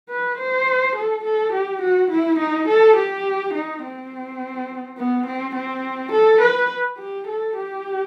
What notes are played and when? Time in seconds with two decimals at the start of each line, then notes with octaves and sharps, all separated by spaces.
0.10 B4
0.39 C5
0.97 A4
1.25 A4
1.53 G4
1.82 F#4
2.11 E4
2.39 D#4
2.68 A4
2.97 G4
3.54 D#4
3.83 C4
4.98 B3
5.27 C4
5.55 C4
6.12 A4
6.41 B4
6.98 G4
7.28 A4
7.56 G4